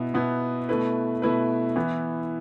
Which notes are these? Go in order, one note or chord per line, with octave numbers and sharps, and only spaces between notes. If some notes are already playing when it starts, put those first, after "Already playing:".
Already playing: B2 B3 E4
B2 B3 E4
B2 A3 E4 B4
B2 A3 E4 B4
E3 B3 E4